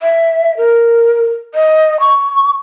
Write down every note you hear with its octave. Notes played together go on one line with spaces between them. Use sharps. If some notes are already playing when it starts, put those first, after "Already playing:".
E5
A#4
D#5
C#6